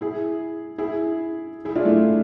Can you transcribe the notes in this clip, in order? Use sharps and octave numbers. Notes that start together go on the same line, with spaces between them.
E4 G#4
E4 G#4
E4 G#4
D4 F4
A3